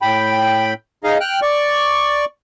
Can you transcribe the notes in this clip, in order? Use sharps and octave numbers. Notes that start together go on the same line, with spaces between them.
A2 G5 B5
D#4 G#4 D#5 F5
G5 F6 F#6
D5 C#6